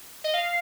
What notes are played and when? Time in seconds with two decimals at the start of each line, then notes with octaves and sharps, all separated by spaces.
0.24 D#5
0.34 F5